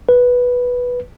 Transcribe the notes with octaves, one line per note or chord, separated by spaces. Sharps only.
B4